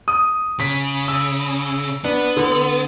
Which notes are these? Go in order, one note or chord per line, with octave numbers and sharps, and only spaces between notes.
D#6
C#3 B6
E6
B3 D4
D3